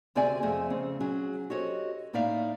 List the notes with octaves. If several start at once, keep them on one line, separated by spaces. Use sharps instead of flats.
D2 C3 C4 G#4 D5 G#5
F2 A3 G#4 D#5
C#3 C4
F#3 C#4 G#4
F#4 G4 A4 C5 C#5 D#5
A2 A#3 D#4 D5 E5 F5